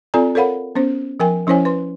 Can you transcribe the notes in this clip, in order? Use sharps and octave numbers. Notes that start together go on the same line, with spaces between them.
C4 F4 A4 D5 G#5 A#5
A4 A#4 C#5 F5 F#5 B5
B3 C#4 C5
F3 A#4 G5 G#5
F3 C#4 E4 C5 C#5 G#5
B4 C6